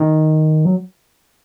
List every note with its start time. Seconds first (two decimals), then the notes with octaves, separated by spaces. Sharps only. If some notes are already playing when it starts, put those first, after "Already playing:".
Already playing: D#3
0.65 F#3